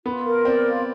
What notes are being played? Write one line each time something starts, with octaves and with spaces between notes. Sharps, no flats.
B3 F4
A#4
C4 D5
F4